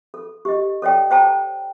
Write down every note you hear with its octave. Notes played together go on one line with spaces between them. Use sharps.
A4
G4 D#5
A4 C#5 D5 G5
C5 G5 A5 A#5